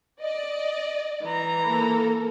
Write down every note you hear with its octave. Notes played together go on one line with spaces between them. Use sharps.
D5 D#5
E3 A#5
A#3 A4 A#4